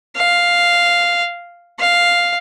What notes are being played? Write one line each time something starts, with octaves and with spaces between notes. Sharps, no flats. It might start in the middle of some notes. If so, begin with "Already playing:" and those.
F5
F5